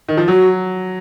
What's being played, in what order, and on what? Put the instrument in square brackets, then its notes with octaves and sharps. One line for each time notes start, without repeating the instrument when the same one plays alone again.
[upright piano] D#3
F3
[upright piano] F#3 [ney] F#4